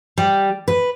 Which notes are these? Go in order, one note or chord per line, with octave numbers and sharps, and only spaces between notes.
G3
B4